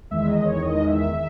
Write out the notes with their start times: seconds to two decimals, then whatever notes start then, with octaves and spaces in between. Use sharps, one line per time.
0.11 E2 D#3 G#3 E5
0.28 D#5
0.45 C#5
0.62 E2 D#3 G#3 D#5
0.88 E5
1.13 D#3 E5